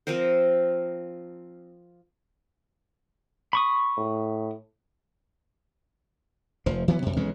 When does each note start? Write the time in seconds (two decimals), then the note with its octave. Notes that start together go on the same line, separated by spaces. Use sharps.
0.07 F3 C4 A#4 C5
3.53 B5 C#6 D#6
3.98 A2
6.66 F1 F3
6.88 E3 F#3 B3
7.02 F#2 C3
7.16 B1 E3 G#3 C#4